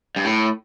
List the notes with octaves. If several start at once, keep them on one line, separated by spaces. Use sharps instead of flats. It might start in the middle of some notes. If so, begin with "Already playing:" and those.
G2
A2